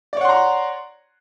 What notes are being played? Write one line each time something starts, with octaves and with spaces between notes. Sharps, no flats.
C#5 D5 F#5 A#5 C6